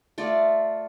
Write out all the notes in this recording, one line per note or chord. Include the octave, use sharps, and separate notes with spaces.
A3 F4 D5